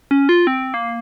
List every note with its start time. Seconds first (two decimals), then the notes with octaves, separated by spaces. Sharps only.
0.11 C#4
0.29 F4
0.47 C4
0.74 A#3